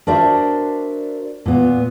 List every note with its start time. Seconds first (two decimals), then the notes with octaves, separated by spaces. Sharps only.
0.07 D4 F#4 A#4 C5 D5 E5
1.46 A#2 B3